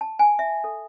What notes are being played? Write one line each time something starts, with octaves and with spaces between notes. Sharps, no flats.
A5
G#5
E5
A4